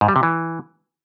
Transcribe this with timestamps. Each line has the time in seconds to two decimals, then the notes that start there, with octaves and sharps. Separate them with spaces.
0.01 G#2
0.08 G3
0.16 C3
0.23 E3